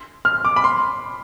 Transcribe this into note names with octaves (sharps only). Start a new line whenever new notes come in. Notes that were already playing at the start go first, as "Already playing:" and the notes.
F6
D6
B5
C6